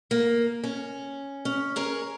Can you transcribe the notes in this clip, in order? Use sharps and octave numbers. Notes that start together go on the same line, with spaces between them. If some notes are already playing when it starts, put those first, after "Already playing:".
A#3
C#4
C#4
G#4 A#4 C#5